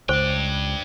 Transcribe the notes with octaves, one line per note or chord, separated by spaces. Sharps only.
C#2 D4 C5 G5